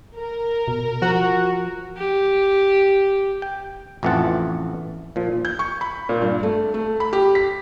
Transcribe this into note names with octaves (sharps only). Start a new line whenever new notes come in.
A#4
B2
F3 F#4
G4
G5
A1 F2 E3 F4 F#5 A5
A#2 F3
G6
C#6
B5
A#2
G2
A3
A3
B5
G4
B6